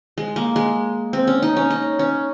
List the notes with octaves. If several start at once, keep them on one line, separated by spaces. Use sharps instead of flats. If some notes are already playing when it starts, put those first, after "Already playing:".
G#3
A#3
G#3
C4
C#4
D#4
C#4
D#4
C#4